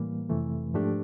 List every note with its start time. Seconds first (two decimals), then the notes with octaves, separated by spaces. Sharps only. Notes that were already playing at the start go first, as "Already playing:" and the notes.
Already playing: A2 E3 G3 A#3
0.29 F2 C3 E3 A3
0.74 G#2 F3 A3 D4 G4